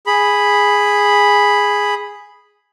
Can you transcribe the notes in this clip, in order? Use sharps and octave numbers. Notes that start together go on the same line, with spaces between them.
G#4 B5